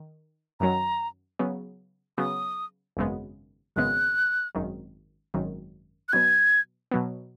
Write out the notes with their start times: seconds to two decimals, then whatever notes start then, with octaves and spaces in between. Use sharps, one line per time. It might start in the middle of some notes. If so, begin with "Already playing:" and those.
Already playing: D#3
0.60 F#2 D#3 F#3 C#4 A#5
1.39 C#3 F#3 B3
2.18 C#3 F#3 B3 D#6
2.97 G#1 F#2 C#3 G#3 B3
3.76 G#1 F#2 C#3 G#3 B3 F#6
4.55 G#1 F#2 D#3 F#3
5.34 G#1 F#2 D#3 F#3
6.09 F#6
6.13 B2 F#3 B3 G#6
6.91 B2 F#3 B3